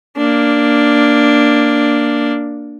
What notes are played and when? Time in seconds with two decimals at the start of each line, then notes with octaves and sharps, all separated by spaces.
0.16 A#3 D4